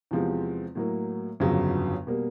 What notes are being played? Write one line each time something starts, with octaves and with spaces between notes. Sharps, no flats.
E2 C3 F3 G#3 C4
A2 F#3 A#3
G1 F2 C#3 F#3
B2 G3 A#3